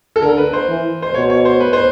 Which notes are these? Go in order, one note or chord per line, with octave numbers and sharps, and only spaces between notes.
A4
D3 A#4
B4
C5
E3
C5
B2 C#5
C#5
C5
B4
C5